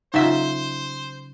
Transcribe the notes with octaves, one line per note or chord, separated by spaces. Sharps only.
C#3 F#3 D#4 F4 C5 E5